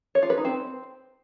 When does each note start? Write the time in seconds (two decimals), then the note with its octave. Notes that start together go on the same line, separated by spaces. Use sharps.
0.15 C#5
0.22 F4
0.30 B4
0.37 D#4
0.45 C4